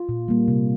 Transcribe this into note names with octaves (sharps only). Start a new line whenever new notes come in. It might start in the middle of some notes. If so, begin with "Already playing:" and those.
Already playing: F4
A#2
G3 A#3
C3